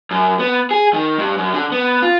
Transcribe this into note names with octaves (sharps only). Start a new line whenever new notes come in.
F#2
B3
G#4
D#3
G2
F#2
D3
B3
F4